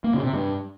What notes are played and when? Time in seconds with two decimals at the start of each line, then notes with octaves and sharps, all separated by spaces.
0.04 A#3
0.14 C#3
0.24 C3
0.34 G2